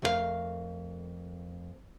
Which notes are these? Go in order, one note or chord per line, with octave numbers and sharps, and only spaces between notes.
F2 A3 C#4 E4 A#4 F5